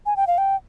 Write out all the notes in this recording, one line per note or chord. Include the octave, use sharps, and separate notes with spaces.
G#5
G5
F5
G5